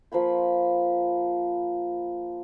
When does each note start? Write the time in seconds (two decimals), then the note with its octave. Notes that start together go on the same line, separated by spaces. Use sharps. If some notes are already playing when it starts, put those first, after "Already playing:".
0.12 F3 A#3 B5 C6